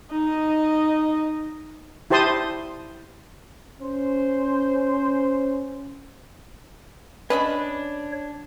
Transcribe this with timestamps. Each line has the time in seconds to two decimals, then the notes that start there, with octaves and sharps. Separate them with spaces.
0.11 D#4 D#5
2.10 E4 G4 C5 A5 C6 D#6
3.81 C#4 C5
7.30 C#4 D4 B4 C#5 D#5 B5